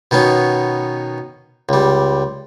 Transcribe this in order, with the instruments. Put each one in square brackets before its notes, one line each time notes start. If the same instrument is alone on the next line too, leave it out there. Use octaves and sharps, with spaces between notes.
[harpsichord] B2 D#3 B3 C#4
C#2 G3